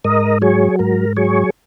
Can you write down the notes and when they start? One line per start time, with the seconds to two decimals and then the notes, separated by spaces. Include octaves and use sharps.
0.04 G#2 A#4 D#5
0.42 F#3 G#4 C#5
0.79 G#2 A#4
1.17 F#3 G#4 C#5